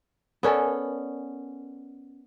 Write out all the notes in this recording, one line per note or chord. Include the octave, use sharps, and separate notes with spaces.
B3 C#4 A4 A#4 D5 G#5